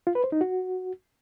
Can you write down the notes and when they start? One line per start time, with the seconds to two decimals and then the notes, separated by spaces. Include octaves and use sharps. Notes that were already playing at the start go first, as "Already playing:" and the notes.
0.07 F4
0.15 B4
0.24 C5
0.32 D#4
0.41 F#4